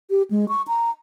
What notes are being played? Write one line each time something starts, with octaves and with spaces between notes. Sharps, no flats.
G4
G#3
C#6
A#5